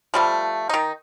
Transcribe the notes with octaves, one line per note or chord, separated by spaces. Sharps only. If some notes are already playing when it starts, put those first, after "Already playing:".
F3 G3 A3
D#3 D#4